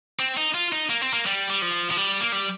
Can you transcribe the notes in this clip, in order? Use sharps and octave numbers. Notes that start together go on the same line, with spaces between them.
C4
D#4
F4
D#4
A#3
C4
A#3
G3
G3
F3
F3
G3
A#3
G3